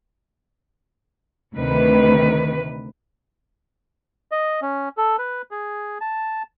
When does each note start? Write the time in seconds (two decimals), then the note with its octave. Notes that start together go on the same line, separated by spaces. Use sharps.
1.54 D2 C3 D#3 B4
4.32 D#5
4.62 C#4
4.97 A4
5.19 B4
5.51 G#4
6.01 A5